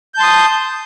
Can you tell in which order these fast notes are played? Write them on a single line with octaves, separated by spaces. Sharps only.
G6 A5 C6 D#6